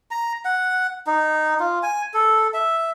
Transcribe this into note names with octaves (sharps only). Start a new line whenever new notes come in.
A#5
F#5
D#4
F4
G#5
A4
E5